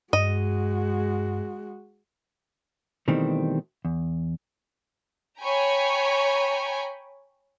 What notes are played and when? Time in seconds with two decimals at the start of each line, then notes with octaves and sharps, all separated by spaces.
0.13 G2 G#3 F#4 D#5
3.08 B2 D#3 E3 G3 A3 C4
3.85 E2
5.41 C#5 G5 G#5 A#5 B5